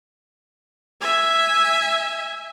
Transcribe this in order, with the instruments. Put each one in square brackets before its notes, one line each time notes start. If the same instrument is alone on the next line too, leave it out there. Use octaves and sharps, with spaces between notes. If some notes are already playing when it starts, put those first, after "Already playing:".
[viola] E5 G#5